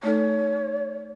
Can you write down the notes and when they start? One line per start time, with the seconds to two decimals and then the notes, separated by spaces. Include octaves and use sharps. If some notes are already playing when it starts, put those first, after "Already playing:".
0.03 A3 D#4 A4 C#5